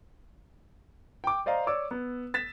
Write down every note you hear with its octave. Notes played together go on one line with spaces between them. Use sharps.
G5 D6
C5 D5 D#5 F5 A#5
C#5 D5 D6 E6
B3
A6 B6 E7